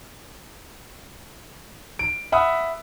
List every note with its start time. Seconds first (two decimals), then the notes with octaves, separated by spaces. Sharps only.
1.99 D7
2.32 E5 F#5 B5 D#6 E6